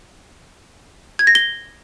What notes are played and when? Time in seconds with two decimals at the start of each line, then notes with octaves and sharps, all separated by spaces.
1.19 G#6
1.27 A#6
1.35 G7